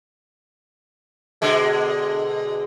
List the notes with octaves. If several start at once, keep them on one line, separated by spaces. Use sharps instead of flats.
B2 D3 G#3